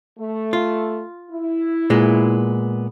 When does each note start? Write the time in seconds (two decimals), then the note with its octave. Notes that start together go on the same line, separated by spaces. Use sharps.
0.19 A3
0.53 F4
1.31 E4
1.90 A#2 G#3 B3